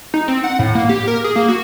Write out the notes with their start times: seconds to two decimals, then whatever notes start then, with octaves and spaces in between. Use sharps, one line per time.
0.14 D#4
0.28 C4
0.44 F#5
0.59 A2
0.75 A#3
0.89 G4
1.08 A#4
1.24 G#4
1.36 A#3
1.48 F#4